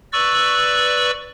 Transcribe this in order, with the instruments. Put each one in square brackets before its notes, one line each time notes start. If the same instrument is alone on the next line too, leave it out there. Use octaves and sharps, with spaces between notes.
[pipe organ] B4 D5 C#6 E6